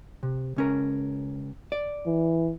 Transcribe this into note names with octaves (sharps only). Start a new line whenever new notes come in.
C3
C#2 C#4 A#4
D5
E3